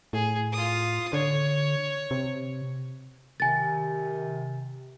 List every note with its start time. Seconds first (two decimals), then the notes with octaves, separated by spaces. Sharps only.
0.13 A2 G#4
0.52 F4 D#6
1.13 D3 C#5
2.11 C3
3.40 C3 D#3 G#5 A6